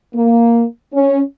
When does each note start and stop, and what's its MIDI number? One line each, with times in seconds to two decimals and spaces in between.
0.15 0.64 58
0.93 1.20 61